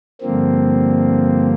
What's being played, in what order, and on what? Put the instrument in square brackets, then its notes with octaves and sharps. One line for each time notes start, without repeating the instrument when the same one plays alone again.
[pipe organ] G2 D3 F3 A#3 C4